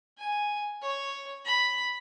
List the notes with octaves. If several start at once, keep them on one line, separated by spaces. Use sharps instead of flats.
G#5
C#5
B5